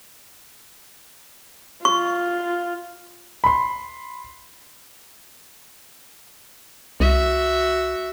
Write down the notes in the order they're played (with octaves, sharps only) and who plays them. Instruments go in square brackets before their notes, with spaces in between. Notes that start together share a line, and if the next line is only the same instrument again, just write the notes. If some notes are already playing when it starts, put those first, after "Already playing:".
[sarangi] F4 [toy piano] C#6
[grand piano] B5 C6
[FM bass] C2 [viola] F#4 E5